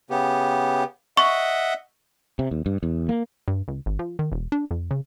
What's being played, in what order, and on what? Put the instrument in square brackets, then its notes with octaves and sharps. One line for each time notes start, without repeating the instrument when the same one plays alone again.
[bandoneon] C#3 B3 G4
[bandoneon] D#5 E5 F#5 [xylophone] C#6
[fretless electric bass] C3
D#2
G2
E2
A#3
[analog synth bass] G2
C#2
G#1
F3
D#3
E1
D4
F2
C#3